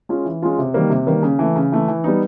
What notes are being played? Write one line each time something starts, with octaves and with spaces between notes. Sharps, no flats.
G#3 C#4 F4
E3
G#3 C#4 F4
C3
D#3 G3 A#3
C3
D#3 G3 A#3
C#3
E3 A3
C#3
E3 A3
E3
G3 B3 D#4